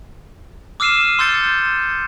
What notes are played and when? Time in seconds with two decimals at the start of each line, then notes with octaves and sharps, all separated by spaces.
0.80 D6 E6 F6 C7 D#7 E7
1.19 C6 E6 G6 A6 C#7